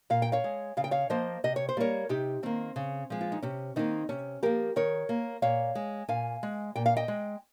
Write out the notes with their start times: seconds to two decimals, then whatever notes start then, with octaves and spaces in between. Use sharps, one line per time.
0.10 A#2 F5
0.22 G5
0.32 C#5 F5
0.44 G#3
0.77 C#3 F5
0.84 G5
0.91 C#5 F5
1.10 F3 A#3 C5 D#5
1.44 C3 D#5
1.56 C#5
1.69 C5
1.77 G3 A#3 A#4 C#5
2.09 C3 D#4 G4
2.43 D#3 A#3 C4
2.76 C#3
3.10 F3 G#3
3.21 F4
3.32 D#4
3.42 C3 C#4
3.76 D#3 A#3 C4 D#4
4.09 C3 C#4
4.43 F3 A#3 G4 A#4
4.76 D#3 A#4 C#5
5.09 A#3
5.42 A#2 C#5 F5
5.75 G#3
6.08 A#2 F5 G#5
6.43 G#3
6.76 A#2 G5
6.86 F5
6.97 D#5 G5
7.08 G#3